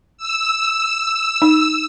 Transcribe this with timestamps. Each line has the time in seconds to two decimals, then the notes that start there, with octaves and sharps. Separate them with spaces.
0.18 E6
1.42 D#4